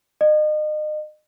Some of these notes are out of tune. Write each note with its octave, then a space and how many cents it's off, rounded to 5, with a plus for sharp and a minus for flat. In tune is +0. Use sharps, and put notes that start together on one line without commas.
D#5 -35